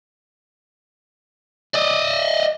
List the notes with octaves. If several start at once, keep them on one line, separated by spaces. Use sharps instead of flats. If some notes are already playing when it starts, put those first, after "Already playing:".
D5 D#5